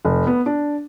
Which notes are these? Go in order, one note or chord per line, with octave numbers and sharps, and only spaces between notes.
F1
B3
D4